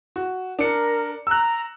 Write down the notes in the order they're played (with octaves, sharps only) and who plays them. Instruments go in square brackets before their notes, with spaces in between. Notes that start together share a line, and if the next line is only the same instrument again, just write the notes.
[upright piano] F#4
[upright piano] D4 C#7 [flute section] A#4
[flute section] A#5 [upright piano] E6 F#6